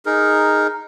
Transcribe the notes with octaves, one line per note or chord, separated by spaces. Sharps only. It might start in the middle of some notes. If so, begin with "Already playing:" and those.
D#4 G#4 A#4